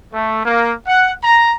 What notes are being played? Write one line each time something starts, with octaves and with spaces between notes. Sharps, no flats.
A3
A#3
F#5
A#5